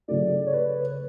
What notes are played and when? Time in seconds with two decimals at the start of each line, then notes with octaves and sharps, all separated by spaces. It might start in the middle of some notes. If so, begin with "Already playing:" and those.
0.08 C#3 F#3 A3 D5
0.46 C#5
0.54 B4